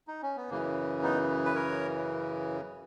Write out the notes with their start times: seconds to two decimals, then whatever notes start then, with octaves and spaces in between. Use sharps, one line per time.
0.08 D#4
0.23 C#4
0.36 B3
0.49 F#2 C#3 E3 A#3
1.02 B3 D#4
1.45 B4
1.55 A#4 C#5